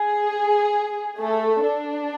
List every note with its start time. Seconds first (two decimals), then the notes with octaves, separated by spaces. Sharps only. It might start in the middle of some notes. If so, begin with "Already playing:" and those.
Already playing: G#4
1.19 A3 A4
1.64 D4